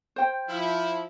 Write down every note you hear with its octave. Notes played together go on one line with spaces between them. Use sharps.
C5 G5
F3 E4